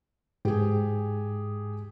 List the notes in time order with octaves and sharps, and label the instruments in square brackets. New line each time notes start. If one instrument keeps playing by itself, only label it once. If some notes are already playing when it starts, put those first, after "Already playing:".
[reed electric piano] G#2 [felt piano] G4 G#4